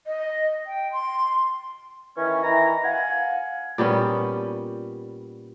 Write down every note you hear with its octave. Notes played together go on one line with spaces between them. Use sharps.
D#5
G5
C6
D#3 E3 C#4
D#3 E3 B4 A#5
F5 F#5 G#5
A#2 G3 B3 C#4